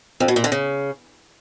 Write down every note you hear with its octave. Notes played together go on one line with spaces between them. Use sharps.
F2
B2
A#2
D3
C#3